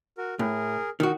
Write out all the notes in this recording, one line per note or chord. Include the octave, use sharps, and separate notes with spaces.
F#4 A#4
A2 G#4 A#4
D#3 F#4